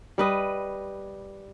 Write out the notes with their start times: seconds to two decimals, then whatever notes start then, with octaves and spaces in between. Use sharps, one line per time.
0.18 G3 B4 D#5